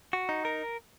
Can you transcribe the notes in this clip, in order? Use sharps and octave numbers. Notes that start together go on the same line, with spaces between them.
F#4
D#4
A#4